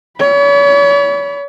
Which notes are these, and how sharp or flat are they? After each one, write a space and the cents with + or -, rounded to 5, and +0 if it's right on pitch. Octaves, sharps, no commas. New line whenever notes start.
C#5 +40 B5 +0